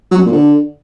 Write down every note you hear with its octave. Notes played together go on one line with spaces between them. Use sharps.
F#3
F#2
A#2
D3